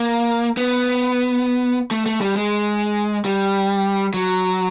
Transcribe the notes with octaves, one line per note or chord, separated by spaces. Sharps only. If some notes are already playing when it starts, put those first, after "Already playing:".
Already playing: A#3
B3
A3
A3
G3
G#3
G3
F#3